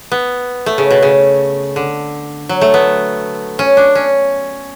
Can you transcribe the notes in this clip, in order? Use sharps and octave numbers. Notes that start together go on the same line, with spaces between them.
B3
A3
C#3
B2
C#3
D3
F#3
A3
B3
C#4
D4
C#4